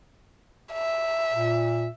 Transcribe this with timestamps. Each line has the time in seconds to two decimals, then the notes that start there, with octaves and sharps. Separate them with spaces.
0.73 E5
1.32 A#2